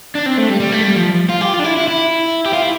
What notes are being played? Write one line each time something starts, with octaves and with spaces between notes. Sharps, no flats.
D4
C4
A3
G3
G3
A3
G3
F3
F4
G4
F4
D4
E4
E4
E4
G4
F4
E4